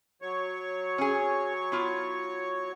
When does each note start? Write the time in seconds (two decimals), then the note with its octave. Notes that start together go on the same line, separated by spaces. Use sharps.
0.22 F#3 C#5 C#6
0.98 C#4 G#4
1.72 B3 E4 F4